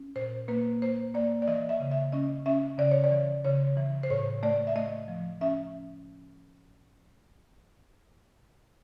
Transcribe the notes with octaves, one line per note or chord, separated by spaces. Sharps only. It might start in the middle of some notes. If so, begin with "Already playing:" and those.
Already playing: C#4
A#2 C5
A#3 B4
A#3 C5
A#3 D5
D5
E3 D#5
E5
C#3
E5
C#4 D#5
C#4 E5
C#3 D5
C#5
D5
E3
C#3 C#5
E3
C5
A2 C#5
A3 D5
E5
A3 D#5
F3
C#4 E5